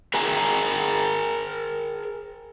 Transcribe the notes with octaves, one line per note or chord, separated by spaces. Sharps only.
G#4 A#4 E5 G5 G#5 A#5